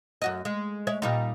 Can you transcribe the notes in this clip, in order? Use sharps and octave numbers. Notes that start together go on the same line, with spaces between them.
F#2 F#4 D#5
G#3
G#3 C#5 E5
A#2 G3 D#4